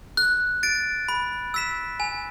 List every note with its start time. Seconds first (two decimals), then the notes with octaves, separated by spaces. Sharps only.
0.17 F#6
0.63 A6 D7
1.09 B5
1.54 E6 B6 E7
2.00 G#5